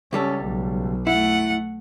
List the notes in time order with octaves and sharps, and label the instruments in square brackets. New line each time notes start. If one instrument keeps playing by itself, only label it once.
[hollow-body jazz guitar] C#2 G3 A4 [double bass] C#4
[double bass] B1
[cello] A3 F#5 [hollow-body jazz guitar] E4